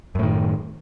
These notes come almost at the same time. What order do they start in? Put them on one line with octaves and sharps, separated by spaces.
F#2 A2 D#3